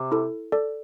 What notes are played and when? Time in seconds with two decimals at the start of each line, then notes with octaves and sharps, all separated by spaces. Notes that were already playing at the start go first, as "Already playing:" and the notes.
Already playing: C3
0.12 E4 A4
0.52 A4 D5